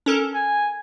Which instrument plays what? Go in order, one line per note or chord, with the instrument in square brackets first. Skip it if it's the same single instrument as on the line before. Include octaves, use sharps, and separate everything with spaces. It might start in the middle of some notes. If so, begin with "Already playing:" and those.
[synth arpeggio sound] C#4 A4 A#4
[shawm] G#5